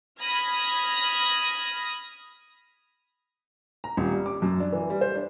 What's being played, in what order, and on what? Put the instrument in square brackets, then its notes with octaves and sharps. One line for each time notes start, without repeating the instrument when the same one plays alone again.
[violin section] B5 D#6 F6 G#6 A#6
[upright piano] A#5
D#1
G3
D6
F#2
D4
E3
G3
C5
D4